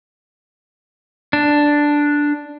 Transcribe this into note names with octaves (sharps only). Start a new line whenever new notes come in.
D4